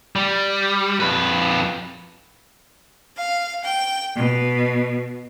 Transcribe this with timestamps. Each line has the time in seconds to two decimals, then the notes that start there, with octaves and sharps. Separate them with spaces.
0.16 G3
1.00 F2 B4
3.16 F5
3.64 G5
4.18 B2